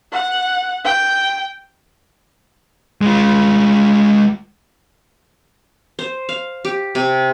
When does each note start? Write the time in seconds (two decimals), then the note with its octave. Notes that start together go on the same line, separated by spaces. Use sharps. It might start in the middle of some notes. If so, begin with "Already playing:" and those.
0.12 F#5
0.84 G5
3.01 G#3 F4
5.99 C5
6.29 F5
6.65 G4
6.95 C3